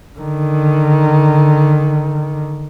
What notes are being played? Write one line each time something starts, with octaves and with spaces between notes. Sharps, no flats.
D3 D#3